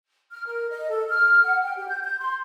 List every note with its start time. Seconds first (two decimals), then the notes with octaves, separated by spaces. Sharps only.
0.31 F6
0.46 A#4
0.71 D#5
0.90 A4
1.09 F6
1.44 F#5
1.63 G5
1.77 G4
1.88 G6
2.03 G6
2.20 C6